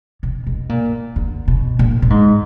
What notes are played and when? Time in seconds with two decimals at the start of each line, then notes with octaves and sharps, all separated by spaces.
0.23 B2
0.46 B2
0.69 A#2
1.16 D3
1.48 B2
1.79 A#2
2.02 A#2
2.10 G#2